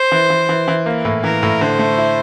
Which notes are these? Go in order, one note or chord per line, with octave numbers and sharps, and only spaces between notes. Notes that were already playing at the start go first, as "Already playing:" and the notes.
Already playing: C5
E3
E3
E3
E3
A#3
A2
E3 A#4
A2
D3 C5
A3
E4